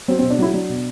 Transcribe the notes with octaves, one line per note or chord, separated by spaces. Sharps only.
F#3 C4
C4
B2
D4
F#3 E4
F#3 D4
B2